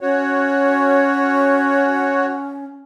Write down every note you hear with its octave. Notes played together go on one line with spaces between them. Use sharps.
C#4 F#4 C#5